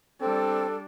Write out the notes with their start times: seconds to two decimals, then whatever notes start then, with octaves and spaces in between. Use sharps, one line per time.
0.21 G3 C4 D4 A4